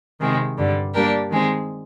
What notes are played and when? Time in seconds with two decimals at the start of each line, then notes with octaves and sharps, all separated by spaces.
0.20 C3 D#3 G#3 C4
0.57 G2 D3 G3
0.93 G3 A#3 D4 G4 A#4
1.30 D#3 G#3 C4